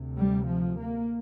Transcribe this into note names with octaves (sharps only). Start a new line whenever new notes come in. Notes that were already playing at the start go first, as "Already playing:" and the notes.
Already playing: D2 C3
G3
F3
A#3